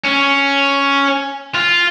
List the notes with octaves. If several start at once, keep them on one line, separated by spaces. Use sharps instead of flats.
C#4
F4